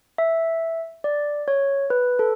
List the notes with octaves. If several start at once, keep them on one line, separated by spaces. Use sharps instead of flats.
E5
D5
C#5
B4
A4